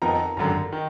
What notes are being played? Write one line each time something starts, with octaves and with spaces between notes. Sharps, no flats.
F2 F3 B3 D#4 A#4 A#5
G#1 F#2 D3 A#5
D#3